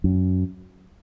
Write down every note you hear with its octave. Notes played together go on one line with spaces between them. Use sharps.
F#2